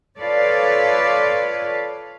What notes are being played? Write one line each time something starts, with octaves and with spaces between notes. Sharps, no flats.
F4 A4 B4 C#5 D5 F5